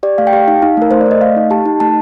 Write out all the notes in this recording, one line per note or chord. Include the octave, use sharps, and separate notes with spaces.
G4 D5
A3 F5
G5
G4 F5
D#4 F5
D#4 F5
A3 A#4
A3 C5
D5
A3 D#5
A3 F5
D#4
G4 A5
D#4
A3 A5